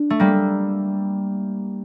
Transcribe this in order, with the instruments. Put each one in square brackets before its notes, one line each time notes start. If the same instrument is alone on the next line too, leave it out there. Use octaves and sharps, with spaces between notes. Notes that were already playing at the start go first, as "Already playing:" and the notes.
Already playing: [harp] D4
A3
G3 A#3